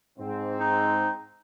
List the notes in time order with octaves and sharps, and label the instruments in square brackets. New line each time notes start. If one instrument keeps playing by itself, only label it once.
[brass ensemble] G#2 C4
[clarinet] D#4